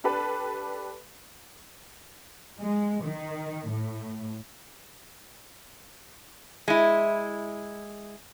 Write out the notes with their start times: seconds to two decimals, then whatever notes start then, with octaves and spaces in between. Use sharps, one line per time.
0.04 D4 G4 A4 B4
2.59 G#3
3.03 D#3
3.68 A2
6.68 G#3 E4